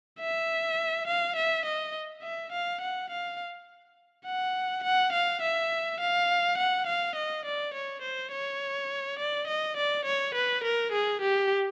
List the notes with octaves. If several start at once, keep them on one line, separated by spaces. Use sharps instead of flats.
E5
F5
E5
D#5
E5
F5
F#5
F5
F#5
F#5
F5
E5
F5
F#5
F5
D#5
D5
C#5
C5
C#5
D5
D#5
D5
C#5
B4
A#4
G#4
G4